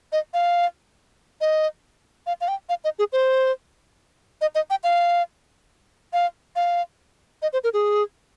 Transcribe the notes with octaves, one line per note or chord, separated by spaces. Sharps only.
D#5
F5
D#5
F5
F5
G5
F5
D#5
G#4
C5
D#5
D#5
G5
F5
F5
F5
D#5
C5
A#4
G#4